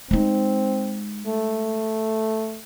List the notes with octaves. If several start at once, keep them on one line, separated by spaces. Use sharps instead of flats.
G#3 C4 D#4
A3